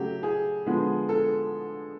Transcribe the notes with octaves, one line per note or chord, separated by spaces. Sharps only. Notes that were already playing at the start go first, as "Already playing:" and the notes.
Already playing: C#3 F#3 A3 G4
G#4
D3 F3 G#3 B3
A4